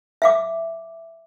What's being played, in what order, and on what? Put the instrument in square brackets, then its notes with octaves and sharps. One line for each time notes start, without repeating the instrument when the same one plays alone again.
[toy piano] E5 F5 D6